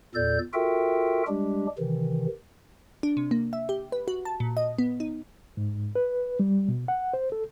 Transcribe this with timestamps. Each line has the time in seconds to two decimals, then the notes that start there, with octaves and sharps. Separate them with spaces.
0.15 E2 A#2 A4 D5 G6
0.53 F4 F#4 A4 A#4 E5 G5
1.28 G3 G#3 D4 G4
1.78 C3 D#3 E3
3.03 D4
3.17 C3
3.31 A#3
3.53 E5
3.69 G4
3.92 B4
4.08 F#4
4.25 A5
4.40 A#2
4.57 D#5
4.78 B3
5.00 D#4
5.57 G#2
5.95 B4
6.40 G3
6.68 B2
6.88 F#5
7.14 C5
7.32 A4